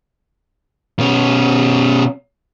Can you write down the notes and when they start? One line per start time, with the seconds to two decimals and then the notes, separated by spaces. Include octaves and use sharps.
1.00 B2 C#4